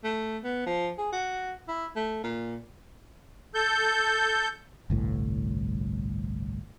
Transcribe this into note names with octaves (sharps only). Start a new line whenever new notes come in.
A3
B3
F3
G#4
F#4
E4
A3
A#2
A4 G6
G1 C2 A2